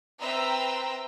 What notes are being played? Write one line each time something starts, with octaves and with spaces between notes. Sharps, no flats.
C4 B4 E5 G5 A#5 E6